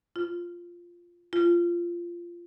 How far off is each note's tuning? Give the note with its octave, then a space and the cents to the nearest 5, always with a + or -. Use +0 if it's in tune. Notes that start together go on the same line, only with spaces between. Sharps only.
F4 -5
F4 -15